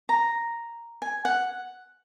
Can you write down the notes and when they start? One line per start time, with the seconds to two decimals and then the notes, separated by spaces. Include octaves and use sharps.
0.09 A#5
1.02 G#5
1.25 F#5